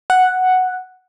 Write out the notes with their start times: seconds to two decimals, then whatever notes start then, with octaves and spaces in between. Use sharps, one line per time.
0.10 F#5